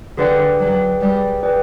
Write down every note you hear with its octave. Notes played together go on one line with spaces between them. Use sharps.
D3 G#4 B4 D5 G5
F#3 G#4 B4 D5 G5
G3 G#4 B4 D5 G5
G#4 B4 D5 G5